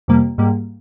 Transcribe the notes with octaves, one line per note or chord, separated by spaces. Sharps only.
F2 C3 G3 A#3
G#2 G3 A#3